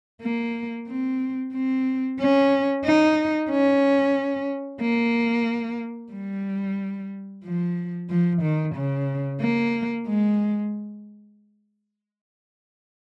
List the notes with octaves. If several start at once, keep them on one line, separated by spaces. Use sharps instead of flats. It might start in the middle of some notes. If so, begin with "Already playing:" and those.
A#3
C4
C4
C#4
D#4
C#4
A#3
G3
F3
F3
D#3
C#3
A#3
G#3